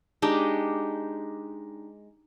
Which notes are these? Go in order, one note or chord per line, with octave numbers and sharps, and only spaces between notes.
G#3 D4 D#4 G4